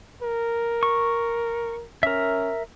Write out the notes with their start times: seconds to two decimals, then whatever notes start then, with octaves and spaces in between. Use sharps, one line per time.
0.22 A#4
0.83 C#6
2.03 C#4 A#4 E5